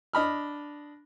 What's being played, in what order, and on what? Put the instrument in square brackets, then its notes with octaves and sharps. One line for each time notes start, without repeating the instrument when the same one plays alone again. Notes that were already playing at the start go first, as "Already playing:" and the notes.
[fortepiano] D4 D#5 B5 F6